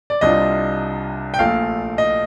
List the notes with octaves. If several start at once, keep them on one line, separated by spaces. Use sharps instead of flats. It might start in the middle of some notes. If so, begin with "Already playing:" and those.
D5
C2 C3 G3 D4 F4 D#5
G5
A#1 A#2 A3 F5
D#5